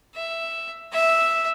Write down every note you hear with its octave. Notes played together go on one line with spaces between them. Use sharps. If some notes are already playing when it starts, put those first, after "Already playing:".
E5
E5